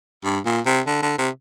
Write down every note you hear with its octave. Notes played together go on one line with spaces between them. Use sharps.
G2
A#2
C3
D3
D3
C3